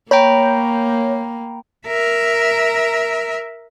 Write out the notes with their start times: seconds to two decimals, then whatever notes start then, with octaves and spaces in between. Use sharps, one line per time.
0.11 A#3 C#5 G5 A#5 B5 G6
1.87 A#4 E5